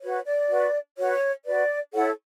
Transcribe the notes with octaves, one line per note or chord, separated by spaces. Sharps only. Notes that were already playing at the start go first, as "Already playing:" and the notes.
F#4 B4 C#5
D5
F#4 B4
F#4 B4 C#5
F#4 B4 D5
E4 A4 C#5 F#5